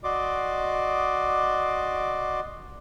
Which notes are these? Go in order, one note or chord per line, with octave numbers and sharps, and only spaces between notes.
F#4 D5 D#5 C6 D6